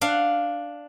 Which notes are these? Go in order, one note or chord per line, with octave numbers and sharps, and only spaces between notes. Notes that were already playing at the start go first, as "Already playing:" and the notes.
D4 F5 F#5